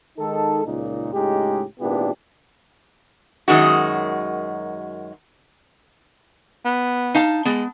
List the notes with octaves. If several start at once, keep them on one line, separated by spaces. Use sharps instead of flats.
D#3 G#3 D#4 A4
C#2 A#2 D#4
C#2 A2 G#3 D#4 G4
G#1 A#2 B3 D4 E4 G4
F#2 D#3 G#3 F#4
B3
D#4 F5 A5
G#3 B3